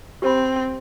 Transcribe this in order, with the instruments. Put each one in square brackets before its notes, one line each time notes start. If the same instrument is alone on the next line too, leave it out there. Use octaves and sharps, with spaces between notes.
[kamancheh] C4 [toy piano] G4 C5 G5 B5